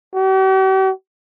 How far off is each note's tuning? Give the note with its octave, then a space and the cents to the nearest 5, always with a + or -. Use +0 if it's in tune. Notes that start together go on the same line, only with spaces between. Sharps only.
G4 -45